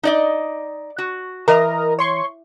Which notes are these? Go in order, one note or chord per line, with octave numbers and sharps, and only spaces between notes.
D#4 D5 D#5
F#4
E3 A#4 D#5 A#5
C#5 C6 C#6